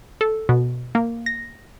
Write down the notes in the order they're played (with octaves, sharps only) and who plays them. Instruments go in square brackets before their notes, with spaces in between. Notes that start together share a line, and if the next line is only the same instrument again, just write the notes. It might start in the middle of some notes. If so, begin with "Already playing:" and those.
[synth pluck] A4
B2
A#3
A#6